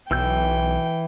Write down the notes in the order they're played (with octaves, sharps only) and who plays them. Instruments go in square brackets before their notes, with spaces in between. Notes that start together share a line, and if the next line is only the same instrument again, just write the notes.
[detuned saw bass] B1 [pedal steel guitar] E3 E6 G6 [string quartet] G5